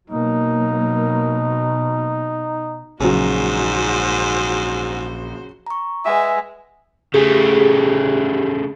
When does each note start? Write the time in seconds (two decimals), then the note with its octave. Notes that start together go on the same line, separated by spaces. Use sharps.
0.10 B2 F#3 A#3 D#4
3.01 A#1 G#2 C#3 F#3 F#4 C5
5.67 A#5 C#6
6.06 G#3 B4 E5 F#5 G#5
7.14 C#3 A3 G4 G#4